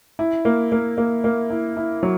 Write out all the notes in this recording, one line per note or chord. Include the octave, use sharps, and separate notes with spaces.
E4
A#3
A#3
A#3
A#3
E4
E4
F#3